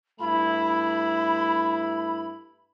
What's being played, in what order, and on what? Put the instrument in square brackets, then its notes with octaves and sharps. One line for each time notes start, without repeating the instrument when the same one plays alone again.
[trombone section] G2 A3 E4 [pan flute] B5